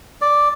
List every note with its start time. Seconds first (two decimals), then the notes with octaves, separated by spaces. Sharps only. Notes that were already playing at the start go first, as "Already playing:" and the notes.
0.22 D5